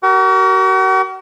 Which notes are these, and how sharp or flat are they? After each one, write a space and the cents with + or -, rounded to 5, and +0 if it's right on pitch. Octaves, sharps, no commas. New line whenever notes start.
F#4 +40 A#4 +0 F#5 +40